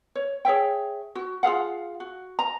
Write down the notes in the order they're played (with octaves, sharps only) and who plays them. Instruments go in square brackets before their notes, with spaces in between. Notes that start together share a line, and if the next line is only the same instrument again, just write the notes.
[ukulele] C#5
G#4 C#5 E5 G5
F#4
F4 G#4 F5 F#5
F#4
A#5